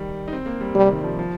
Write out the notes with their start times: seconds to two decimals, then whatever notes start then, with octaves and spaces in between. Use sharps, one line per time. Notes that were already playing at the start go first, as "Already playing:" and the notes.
Already playing: D#3 G3
0.28 D#4
0.33 C4
0.46 A#3
0.61 G3
0.75 C3 G3
0.89 D#3
1.04 F3
1.19 F3